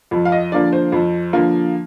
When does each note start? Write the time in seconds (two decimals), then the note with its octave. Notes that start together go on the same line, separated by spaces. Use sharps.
0.11 F2
0.25 F5
0.32 D#5
0.52 D3 F3 A#3 D5
0.73 C5
0.92 F2
1.33 D3 F3 A#3